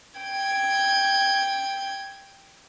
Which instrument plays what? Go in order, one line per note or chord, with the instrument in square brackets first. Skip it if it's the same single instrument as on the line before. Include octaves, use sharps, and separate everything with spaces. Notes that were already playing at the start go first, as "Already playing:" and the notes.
[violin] G5 G#6